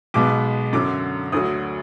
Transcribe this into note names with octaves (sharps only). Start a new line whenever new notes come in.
B1 B2 G#3 B3 D6
F#2 D3 F#3 D6
D2 D3 F#3 D#6